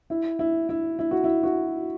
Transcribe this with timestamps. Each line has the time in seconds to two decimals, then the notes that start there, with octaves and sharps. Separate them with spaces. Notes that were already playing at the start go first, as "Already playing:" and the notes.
0.10 E4
0.39 E4
0.69 E4
0.99 E4
1.11 F#4
1.24 E4
1.44 F#4